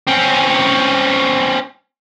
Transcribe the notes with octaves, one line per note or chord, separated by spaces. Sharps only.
C4 C#4